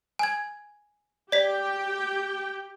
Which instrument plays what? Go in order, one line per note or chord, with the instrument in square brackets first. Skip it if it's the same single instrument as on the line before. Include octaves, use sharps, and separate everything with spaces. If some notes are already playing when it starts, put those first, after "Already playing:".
[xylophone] G#5 G#6
[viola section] G4 G5 [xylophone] D5 B6